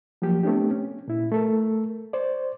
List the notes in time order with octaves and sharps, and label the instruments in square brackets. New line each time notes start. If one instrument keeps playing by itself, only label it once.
[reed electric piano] F3 F#3 A#3 G4
A3 B3 C4 D4 G4
C#4
A#2 E4
A3 A4 A#4
C5 D5